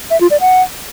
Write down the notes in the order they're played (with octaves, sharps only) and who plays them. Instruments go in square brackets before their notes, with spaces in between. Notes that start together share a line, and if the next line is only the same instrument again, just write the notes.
[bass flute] E5
F4
D5
F#5